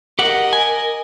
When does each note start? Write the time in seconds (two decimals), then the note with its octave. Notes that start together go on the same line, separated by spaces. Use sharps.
0.19 G4 A#4 D#5 F#5
0.53 G#5